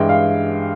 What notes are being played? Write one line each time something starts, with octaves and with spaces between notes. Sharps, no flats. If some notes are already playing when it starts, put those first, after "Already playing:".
Already playing: G2 E3 G#3 G5
F5